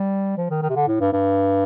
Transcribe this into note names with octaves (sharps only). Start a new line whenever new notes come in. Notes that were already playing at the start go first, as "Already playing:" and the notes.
Already playing: G3
F3
D#3
D#3
C3
D3
A2
G2
G2